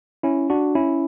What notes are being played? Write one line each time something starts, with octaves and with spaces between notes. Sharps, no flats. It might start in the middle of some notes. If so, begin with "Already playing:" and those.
C#4 E4
D4 F#4
C#4 E4